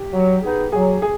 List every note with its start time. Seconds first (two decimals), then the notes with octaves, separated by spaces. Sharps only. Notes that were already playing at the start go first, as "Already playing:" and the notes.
Already playing: G4
0.12 F#3
0.43 B3 D#4 G#4
0.72 F#3 G#4
1.02 G#4